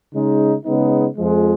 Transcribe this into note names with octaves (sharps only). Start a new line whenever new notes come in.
C#3 G#3 D#4
C#3 G#3 B3 D#4
F2 F3 G#3